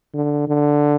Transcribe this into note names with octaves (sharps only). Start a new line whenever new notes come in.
D3
D3